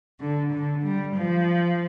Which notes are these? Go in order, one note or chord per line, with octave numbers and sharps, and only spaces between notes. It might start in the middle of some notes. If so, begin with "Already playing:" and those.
D3
D3
G3
F3